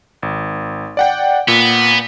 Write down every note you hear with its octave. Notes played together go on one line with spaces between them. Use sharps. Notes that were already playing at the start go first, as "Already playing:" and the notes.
G#1
D5 F#5 G5
A#2 B3